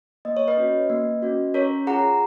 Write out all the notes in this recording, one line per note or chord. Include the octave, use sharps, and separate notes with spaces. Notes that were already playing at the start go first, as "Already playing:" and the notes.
A#3 D#5
C#5
B4 D#5
C#4 F#4
A#3
C#4 F#4
C#4 A#4 C#5
F4 G#4 F#5 A#5